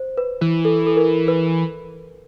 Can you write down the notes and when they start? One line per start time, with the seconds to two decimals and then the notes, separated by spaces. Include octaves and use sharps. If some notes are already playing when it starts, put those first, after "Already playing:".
Already playing: C5
0.18 B4
0.41 E3
0.65 A4
0.87 A4
0.97 A#4
1.28 B4